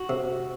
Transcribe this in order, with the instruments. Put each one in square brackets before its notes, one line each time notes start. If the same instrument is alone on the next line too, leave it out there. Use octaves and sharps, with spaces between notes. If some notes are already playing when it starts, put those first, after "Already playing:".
Already playing: [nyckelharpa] F#4
[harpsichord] C3